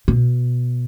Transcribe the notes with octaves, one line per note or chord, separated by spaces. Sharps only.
B2